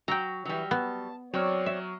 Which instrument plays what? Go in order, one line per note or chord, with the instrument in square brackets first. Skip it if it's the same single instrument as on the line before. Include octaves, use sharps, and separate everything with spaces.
[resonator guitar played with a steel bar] F#3 [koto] G5 A#5
[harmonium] E3 [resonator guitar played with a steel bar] F#3 G3
[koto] B3 [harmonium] A5
[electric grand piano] F#3 C#6 F6 [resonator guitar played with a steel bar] C4 [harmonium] C#5 D5
[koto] E5